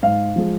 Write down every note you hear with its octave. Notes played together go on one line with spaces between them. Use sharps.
G#2 F5
F3 G#3